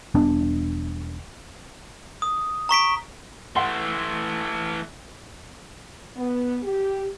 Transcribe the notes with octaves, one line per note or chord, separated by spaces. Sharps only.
E1 G3 B3 D4
D#6
A#5 C#6 B6 D7
E3 A3 F#5 C6
B3
G4